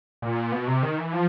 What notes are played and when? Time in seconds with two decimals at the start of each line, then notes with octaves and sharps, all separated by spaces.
0.22 A#2
0.52 B2
0.67 C3
0.83 D#3
0.98 E3
1.13 F3